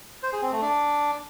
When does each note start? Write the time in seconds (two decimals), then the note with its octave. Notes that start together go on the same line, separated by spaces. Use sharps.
0.23 C5
0.33 G#4
0.42 C4
0.52 A3
0.62 D4